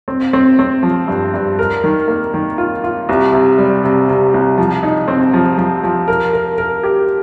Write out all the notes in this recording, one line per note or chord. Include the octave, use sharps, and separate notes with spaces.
C4
C4
C4
F3
G2
G2
A#4
D#3
A#3
D#3
F4
F4
C2
C3
G3
C3
C3
C2
F3
D#4
C4
F3
F3
F3
A#4
A#4
A#4
G4